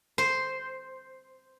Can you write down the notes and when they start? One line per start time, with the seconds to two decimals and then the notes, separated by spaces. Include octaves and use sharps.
0.18 C5